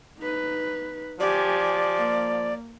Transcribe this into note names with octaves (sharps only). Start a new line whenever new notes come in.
D#4 B4
F3 G4 D5 G#5
A#3